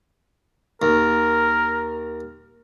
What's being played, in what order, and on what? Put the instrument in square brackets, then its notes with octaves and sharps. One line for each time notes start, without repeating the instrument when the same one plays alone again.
[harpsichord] D#2 [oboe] A#4